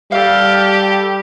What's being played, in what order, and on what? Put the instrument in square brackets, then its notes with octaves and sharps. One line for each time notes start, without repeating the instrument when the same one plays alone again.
[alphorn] G3 [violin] G4 [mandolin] A4 F5